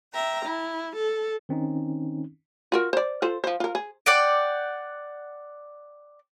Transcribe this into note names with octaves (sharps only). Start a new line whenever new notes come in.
E5 G5 A#5
E4
A4
D#3 C4 C#4 D#4
F4 F#4 A#4
C5 D5
F4 A4 C5
F3 C5
F4 A#4
G#4
D5 F#5 G5